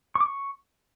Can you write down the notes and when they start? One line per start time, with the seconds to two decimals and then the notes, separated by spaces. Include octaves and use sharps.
0.15 C#6
0.21 D6
0.26 C#6